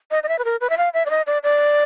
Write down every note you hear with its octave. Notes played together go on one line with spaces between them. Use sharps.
D#5
D#5
E5
B4
A#4
B4
E5
F5
E5
D5
D#5
D5
D5